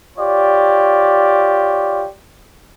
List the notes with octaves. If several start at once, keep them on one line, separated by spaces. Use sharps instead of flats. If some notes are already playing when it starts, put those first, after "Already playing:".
F4 G4 C#5 D5